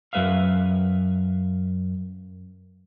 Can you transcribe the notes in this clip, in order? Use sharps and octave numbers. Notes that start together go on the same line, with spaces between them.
F#2 A#3 B4 E5 F5